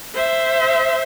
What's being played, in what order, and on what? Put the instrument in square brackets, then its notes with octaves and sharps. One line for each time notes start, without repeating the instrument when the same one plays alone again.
[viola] C5 E5